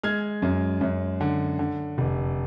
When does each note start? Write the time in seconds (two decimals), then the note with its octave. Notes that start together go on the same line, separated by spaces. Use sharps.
0.04 G#3 F6 G#6
0.42 F#2
0.81 F#2
1.21 D3
1.59 D3
1.98 F1